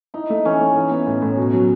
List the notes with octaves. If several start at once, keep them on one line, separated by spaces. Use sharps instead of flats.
D#4 E4
A3
E3 C#4
A3
E3
B3
A2
A2
B2
F#3